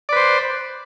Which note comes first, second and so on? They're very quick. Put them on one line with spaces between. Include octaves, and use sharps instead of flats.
D5 B4 C5